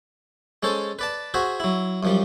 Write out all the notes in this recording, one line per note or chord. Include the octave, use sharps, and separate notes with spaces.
G#3 C#4 A4 C5
B4 D5 A5
F#4 G#4 C5 E5
F#3 E4
F#2 F3 G3